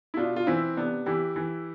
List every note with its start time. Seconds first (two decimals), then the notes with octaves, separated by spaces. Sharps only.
0.14 E4
0.17 B2 D4 F4
0.36 F4
0.47 E3 C4 E4
0.77 C3 B3 D4
1.06 E3 E4 G4
1.36 E3